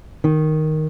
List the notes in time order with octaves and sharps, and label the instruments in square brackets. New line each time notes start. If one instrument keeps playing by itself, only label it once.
[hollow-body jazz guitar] D#3